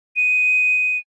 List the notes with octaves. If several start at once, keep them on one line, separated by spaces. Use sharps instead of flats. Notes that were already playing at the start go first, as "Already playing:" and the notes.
D#7